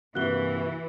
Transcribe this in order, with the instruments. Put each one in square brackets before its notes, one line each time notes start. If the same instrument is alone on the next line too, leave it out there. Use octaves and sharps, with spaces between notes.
[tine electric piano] G2 C3 A#3 [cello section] E3 [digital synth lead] F#4 [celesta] F#6 G7